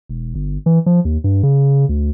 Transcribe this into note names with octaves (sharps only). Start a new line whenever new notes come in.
E1
G1
E3
F3
D#2
G2
C#3
D2